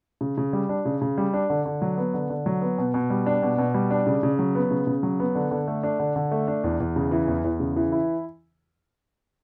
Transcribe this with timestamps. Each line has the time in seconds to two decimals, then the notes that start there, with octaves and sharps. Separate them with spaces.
0.21 C#3
0.38 C#3
0.53 G3
0.69 D4
0.85 C#3
1.02 C#3
1.18 G3
1.34 D4
1.50 D3
1.66 D3
1.82 F#3
1.97 B3
2.14 D3
2.30 D3
2.46 F#3
2.62 B3
2.78 B2
2.94 B2
3.10 G3
3.26 D4
3.42 B2
3.58 B2
3.74 G3
3.91 D4
4.07 C#3
4.23 C#3
4.39 F#3
4.55 B3
4.71 C#3
4.87 C#3
5.03 F#3
5.20 B3
5.35 D3
5.51 D3
5.68 A3
5.83 D4
6.00 D3
6.16 D3
6.31 A3
6.48 D4
6.64 E2
6.80 E2
6.96 C#3
7.11 E3
7.28 E2
7.44 E2
7.60 C#3
7.76 E3
7.92 E4